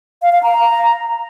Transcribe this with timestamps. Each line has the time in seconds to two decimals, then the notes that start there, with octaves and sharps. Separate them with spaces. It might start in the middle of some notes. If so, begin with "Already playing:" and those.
0.22 F5
0.32 F5
0.43 A#5